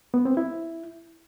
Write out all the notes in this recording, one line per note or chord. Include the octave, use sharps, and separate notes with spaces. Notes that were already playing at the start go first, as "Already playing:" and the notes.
B3
C4
E4